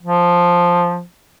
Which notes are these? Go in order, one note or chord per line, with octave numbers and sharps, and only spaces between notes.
F3